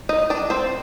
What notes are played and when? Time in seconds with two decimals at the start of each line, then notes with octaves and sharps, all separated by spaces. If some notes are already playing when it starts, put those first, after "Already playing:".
0.09 D#4 D#5
0.30 D4 D5
0.50 C4 C5